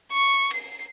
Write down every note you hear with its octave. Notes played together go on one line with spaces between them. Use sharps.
C#6
C7